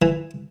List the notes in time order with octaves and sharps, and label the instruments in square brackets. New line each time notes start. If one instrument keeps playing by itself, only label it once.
[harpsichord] E3